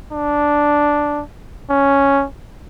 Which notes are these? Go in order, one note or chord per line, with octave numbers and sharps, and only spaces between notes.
D4
C#4